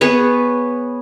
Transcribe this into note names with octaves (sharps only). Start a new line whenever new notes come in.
B3 G#4 B4 C#5